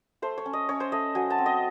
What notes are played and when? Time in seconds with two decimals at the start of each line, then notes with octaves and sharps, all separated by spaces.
0.22 A3 C5
0.38 C#5
0.45 C#4
0.53 D#5
0.69 C#4 C#5
0.80 C5
0.92 A3 D#5
1.15 F#3 G#5
1.30 A5
1.38 C4
1.46 D#5